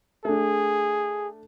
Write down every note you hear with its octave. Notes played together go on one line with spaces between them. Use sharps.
A3 D4 G#4